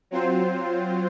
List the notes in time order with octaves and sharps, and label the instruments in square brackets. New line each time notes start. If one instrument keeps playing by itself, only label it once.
[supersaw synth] F#3 C4 F4 C5